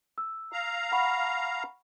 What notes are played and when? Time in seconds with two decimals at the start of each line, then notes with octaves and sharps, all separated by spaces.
0.18 E6
0.52 F5 A#5
0.92 F#5 B5 C#6